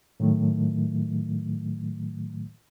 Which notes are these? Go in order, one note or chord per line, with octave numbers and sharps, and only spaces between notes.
A2 D#3 F#3 A3